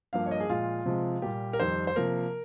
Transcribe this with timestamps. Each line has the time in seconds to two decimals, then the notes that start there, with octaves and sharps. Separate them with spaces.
0.13 G2 F3 A#3 F5
0.26 C#5
0.31 D#5
0.40 G#4
0.49 A#2 F3 G#3 F4
0.85 C3 F3 G#3
1.22 A#2 G3 A#3 G4
1.53 A#4
1.59 F2 D#3 G3 C5
1.87 C5
1.96 C3 F3 A#3 A#4